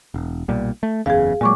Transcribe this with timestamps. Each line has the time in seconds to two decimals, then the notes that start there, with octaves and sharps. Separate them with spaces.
0.14 E1
0.48 B1 A#2 G3
0.83 A3
1.06 F#1 E2 C#3 G#4 F5
1.41 A#2 F#3 G#3 C#6 D6